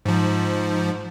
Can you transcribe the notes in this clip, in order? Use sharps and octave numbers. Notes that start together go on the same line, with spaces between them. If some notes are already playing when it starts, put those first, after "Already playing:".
G#2 F3